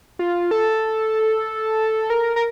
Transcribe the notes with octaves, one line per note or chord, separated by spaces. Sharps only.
F4
A4
A#4
A#4